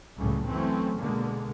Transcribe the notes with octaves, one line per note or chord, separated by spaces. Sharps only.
C#2 F#2 A2 C#3 G3 A3
E3 F#3 A3 C4 C#4
B2 D3 G#3 A#3